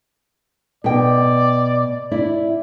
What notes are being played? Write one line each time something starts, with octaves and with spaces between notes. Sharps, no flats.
B2 D5 G5
E4 D5